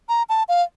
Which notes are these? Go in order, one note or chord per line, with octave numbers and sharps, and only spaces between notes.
A#5
A5
F5